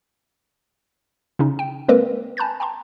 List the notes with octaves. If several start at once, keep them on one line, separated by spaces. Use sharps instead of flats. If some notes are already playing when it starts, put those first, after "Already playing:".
C#3 C#4 D#4
G5
G#3 A#3 C4 A#4 B4
G#5 A5 B5 F#6 G6 A6
G5 A5 A#5 C6